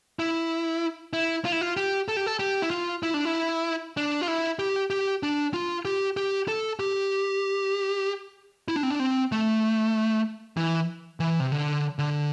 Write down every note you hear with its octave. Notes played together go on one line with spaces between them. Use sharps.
E4
E4
F4
E4
F4
G4
A4
G4
A4
G4
E4
F4
E4
D4
E4
D4
F4
E4
G4
G4
D4
F4
G4
G4
A4
G4
E4
D4
C4
D4
C4
A3
E3
E3
C3
D3
D3